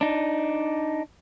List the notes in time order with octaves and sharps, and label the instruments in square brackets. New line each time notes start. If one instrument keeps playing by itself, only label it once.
[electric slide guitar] D4 D#4